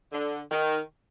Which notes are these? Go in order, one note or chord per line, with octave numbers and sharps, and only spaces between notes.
D3
D#3